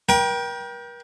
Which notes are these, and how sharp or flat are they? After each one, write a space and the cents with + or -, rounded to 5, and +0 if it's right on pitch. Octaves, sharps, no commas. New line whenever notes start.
A#4 +45 G5 +0